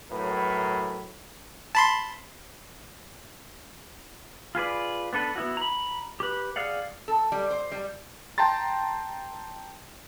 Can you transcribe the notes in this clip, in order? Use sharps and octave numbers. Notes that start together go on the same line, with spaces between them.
A2 F#3 A#4 B4
A5 B5 C6
F4 G#4 B4 D5
B3 D4 A4 B4
B3 E4 F#4
A#5 B5
G4 B4
G#4 D5 F5 F#5
A4
G3
C5
G3
G5 A5 A#5 C6 A6